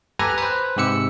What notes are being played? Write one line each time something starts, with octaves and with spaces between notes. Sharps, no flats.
G4 A4 B4 G#5 A#5
B4 C5
G#2 C3 G4 E6 C#7